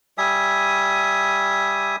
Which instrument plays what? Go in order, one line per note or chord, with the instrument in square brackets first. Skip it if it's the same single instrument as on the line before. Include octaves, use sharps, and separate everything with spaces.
[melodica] G3 E5 G#5 D#6